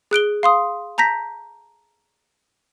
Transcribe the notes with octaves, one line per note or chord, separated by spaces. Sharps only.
G#4 F#6 D7 G7
F5 C6 D#6
A5 A#5 G6 A#6 B6